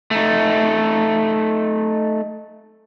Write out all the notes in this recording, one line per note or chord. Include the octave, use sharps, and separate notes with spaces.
A3 D#4